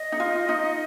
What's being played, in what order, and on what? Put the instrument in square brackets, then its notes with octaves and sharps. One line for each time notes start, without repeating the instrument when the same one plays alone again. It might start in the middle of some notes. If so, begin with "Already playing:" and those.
Already playing: [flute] D#5
[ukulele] D#4
F4
D#4